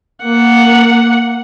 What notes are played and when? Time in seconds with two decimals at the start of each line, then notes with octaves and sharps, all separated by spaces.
0.25 A#3 F#5